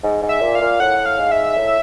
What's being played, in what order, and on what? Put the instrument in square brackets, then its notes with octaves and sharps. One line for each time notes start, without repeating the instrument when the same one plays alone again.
[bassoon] G#2
G#2
[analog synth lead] E5
[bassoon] A#2
[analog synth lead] F5
[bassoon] A#2
[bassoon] A2 [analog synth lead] F#5
[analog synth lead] F5
[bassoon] G#2
[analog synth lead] E5
[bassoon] A2